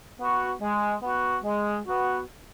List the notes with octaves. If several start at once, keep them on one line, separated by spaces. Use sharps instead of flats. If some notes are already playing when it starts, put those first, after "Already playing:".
B3 F#4
G#3
B3 F#4
G#3
B3 F#4